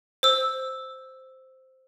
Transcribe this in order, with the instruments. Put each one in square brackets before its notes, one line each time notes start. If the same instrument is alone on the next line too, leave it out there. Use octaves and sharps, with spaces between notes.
[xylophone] C5 E6